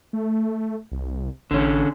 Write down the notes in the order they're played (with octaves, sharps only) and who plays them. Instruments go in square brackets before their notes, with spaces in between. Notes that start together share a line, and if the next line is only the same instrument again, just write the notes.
[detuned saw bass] A3
C2
[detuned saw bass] A1 [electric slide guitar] D3 C#4